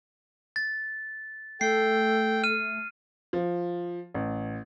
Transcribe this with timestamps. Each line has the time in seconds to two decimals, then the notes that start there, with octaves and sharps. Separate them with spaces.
0.56 A6
1.61 A3 A4 G5 C7
2.44 F6 D#7
3.33 F3
4.14 A1